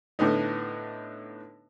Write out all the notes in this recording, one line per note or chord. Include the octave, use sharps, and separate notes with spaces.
A2 D3 B3 D#4